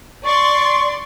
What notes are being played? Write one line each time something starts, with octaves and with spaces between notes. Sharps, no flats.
D5 C6 C#6